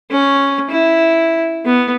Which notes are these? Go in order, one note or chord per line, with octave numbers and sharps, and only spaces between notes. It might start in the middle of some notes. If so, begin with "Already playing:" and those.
C#4
E4
B3